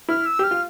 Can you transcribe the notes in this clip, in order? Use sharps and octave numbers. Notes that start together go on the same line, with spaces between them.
E4 F6
E6
G4 F6
F4